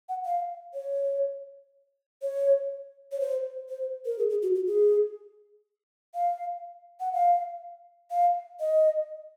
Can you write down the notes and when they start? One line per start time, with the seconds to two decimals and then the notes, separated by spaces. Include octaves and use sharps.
0.09 F#5
0.25 F5
0.74 C#5
2.22 C#5
3.12 C#5
3.20 C5
3.70 C5
4.06 A#4
4.18 G#4
4.30 G#4
4.42 F#4
4.55 F#4
4.67 G#4
6.15 F5
7.00 F#5
7.13 F5
8.11 F5
8.60 D#5